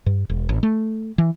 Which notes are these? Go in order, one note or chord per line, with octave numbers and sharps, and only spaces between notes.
G2
E1
A1
A3
E3